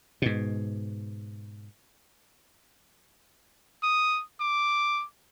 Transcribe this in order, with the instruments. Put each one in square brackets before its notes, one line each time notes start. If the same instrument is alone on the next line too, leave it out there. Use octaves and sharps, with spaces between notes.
[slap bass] G#2 B2
[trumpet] D#6
D6